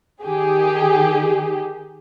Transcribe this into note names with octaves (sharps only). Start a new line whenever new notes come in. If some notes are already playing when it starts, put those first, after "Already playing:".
D#3 G4 G#4